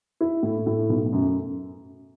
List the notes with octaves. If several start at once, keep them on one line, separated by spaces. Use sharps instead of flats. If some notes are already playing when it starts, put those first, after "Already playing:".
E4
A2
A2
B1
F#2